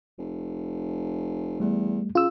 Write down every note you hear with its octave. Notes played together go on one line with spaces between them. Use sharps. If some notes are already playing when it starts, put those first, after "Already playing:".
F1
E2 G3 A3
C#3 F4 E6